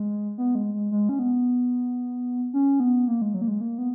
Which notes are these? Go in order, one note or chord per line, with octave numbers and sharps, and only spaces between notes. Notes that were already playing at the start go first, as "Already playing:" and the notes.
Already playing: G#3
B3
G#3
G#3
G#3
C#4
B3
C#4
B3
A#3
G#3
F#3
A#3
G#3
A#3
B3